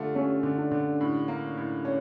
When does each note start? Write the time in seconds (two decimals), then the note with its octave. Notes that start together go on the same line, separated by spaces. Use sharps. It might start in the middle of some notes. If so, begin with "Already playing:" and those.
Already playing: D3 A3 F4 G4
0.15 A3 C#4
0.43 D3
0.58 D4
0.72 D3
1.01 A2
1.28 A#3
1.57 A2
1.85 C#4